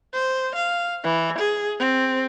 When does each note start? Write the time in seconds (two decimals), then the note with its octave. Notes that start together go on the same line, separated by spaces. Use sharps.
0.14 C5
0.56 F5
1.04 E3
1.39 G#4
1.80 C4